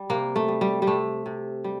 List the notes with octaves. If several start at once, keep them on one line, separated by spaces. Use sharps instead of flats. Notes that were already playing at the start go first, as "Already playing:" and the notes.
Already playing: G3
C3 A#3
A3
G3
G3
G3
C3 A3
C3
G3